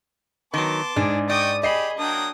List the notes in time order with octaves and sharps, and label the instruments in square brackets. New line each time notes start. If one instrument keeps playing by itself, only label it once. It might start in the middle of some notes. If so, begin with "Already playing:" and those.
[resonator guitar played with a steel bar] D#3 F#3 [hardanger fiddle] B3 [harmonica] A5 C6 D6
[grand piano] G#2 [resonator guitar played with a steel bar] D4 [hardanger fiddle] G#4
[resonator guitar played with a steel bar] D5 [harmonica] D#5 G5 C#6 [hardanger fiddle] D#6
[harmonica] G4 [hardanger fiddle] G#4 B5 [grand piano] D#5 C7
[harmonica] F#3 A#3 D#6 [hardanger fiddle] D4 G5